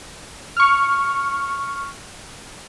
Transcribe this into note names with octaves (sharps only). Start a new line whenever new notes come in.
C#6 F6